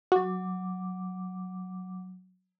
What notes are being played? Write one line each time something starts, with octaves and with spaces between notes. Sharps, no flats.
F#3 F#4 D6